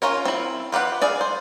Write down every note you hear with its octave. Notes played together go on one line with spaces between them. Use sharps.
C#4 F4 A#4 C#5
C4 E4
F4 G4 B4 F#5
G#4 D5 F5
C5